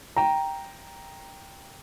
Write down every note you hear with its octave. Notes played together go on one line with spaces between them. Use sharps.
G5 A#5